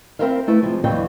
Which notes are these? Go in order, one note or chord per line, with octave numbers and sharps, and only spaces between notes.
C4 E4 A#4 C5 E5 F5
A3 E4 B4
C3 F3 G#3
D#2 D3 E3 F#3 G3 G5